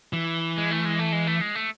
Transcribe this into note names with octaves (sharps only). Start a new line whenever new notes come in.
E3
G#3
A3
G#3
A3
G#3
A3
G#3
A3